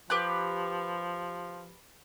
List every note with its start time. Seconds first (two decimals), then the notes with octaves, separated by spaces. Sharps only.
0.10 F3 G4 B4 F#6